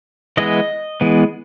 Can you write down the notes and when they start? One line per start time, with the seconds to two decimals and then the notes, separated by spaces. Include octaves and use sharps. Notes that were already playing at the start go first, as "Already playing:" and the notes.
0.37 E3 G#3 B3 D#5
1.01 E3 G#3 B3